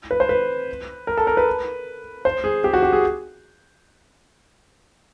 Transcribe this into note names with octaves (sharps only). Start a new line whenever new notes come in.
B4
C5
B4
A#4
A4
A#4
B4
C5
G#4
G4
F#4
G4
G#4